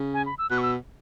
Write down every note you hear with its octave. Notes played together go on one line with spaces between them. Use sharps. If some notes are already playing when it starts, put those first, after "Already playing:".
Already playing: C#3
G#5
B5
E6
B2 F#6
C#6
E6